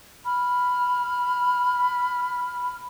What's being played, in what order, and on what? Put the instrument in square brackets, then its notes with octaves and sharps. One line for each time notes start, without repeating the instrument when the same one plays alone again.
[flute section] B5 F6